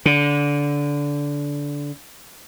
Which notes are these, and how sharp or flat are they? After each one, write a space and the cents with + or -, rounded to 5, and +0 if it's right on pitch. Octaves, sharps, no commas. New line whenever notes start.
D3 -20